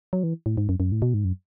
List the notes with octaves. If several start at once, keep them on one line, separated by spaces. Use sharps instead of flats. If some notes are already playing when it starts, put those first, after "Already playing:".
F#3
E3
A2
G#2
F#2
F#2
A2
B2
G#2
F#2